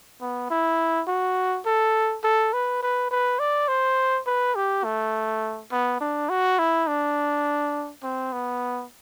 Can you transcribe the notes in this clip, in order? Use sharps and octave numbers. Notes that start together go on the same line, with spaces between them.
B3
E4
F#4
A4
A4
B4
B4
B4
D5
C5
B4
G4
A3
B3
D4
F#4
E4
D4
C4
B3